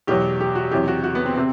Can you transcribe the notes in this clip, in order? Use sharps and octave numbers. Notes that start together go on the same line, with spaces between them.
E2 B2 F#3 G4
G4
F#4
E2 C3 F#3 G4
F#4
F#4
B3
C4
C3 C4